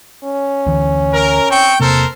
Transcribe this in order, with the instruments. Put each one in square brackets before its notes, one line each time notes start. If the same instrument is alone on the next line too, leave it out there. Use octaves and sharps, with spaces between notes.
[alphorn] C#4
[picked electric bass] D2 E3
[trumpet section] A#4
C4 G5 C#6
[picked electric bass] E1 C3 A#3 [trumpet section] A4 A#4 C5